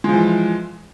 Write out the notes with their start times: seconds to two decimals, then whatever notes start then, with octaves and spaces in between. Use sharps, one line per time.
0.04 G#3
0.09 F3
0.14 E3